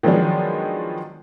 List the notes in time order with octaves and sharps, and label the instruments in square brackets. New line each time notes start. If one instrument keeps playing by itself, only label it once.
[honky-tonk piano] D#3 F3 F#3 G#3 B3 D4